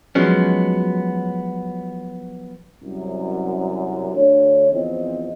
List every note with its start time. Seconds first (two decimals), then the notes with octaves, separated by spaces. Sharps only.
0.15 F3 F#3 G#3 B3 C#4
2.82 C2 F#2
4.14 D2 D3 C#5
4.72 E2 F3 C4 D#5